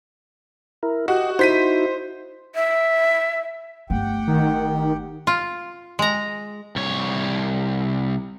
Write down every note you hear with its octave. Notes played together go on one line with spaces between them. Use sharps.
E4 A#4
F#4 G4 D#5
D#4 E4 F#4 C5 B6 D#7
E5
G1 A3 G4 F#5 G5
D#3
F4
G#3 A#5
C2 C#5